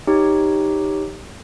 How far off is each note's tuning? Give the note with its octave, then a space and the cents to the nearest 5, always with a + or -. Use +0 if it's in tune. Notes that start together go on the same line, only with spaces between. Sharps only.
D#4 +0 G4 +0 C#5 +0